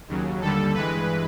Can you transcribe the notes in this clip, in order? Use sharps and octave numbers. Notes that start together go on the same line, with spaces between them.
D#2 C#3 F#3
D#2 D3 G3 A4
G2 E3 G#3 B4